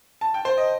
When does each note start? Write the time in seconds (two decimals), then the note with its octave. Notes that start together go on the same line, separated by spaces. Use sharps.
0.21 A5
0.34 G5
0.45 C5
0.58 D#5